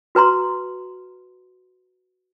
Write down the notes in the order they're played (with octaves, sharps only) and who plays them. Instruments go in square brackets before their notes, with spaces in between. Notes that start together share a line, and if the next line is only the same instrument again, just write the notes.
[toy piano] F#4 B4 A#5 C6